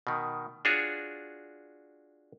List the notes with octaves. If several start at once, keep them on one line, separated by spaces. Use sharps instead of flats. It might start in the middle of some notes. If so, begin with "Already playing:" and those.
B2 D#3
D4 F4 F#4 G#4 C#5